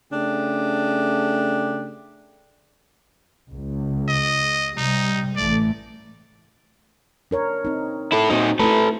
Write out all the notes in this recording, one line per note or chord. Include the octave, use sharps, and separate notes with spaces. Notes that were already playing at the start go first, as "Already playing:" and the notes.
C#3 A3 D4 G4
C#2
D#5
C3 G3 D#4
A1 E3 A3 D5
D4 A#4 C#5
C4 D#4
E4 A4
A#2 C4 D#4 F#4 C5
A3 E4 A4 B4